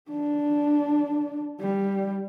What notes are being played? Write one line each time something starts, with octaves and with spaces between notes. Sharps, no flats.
D4
G3